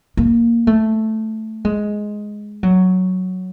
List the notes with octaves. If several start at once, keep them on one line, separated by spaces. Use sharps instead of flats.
A#3
A3
G#3
F#3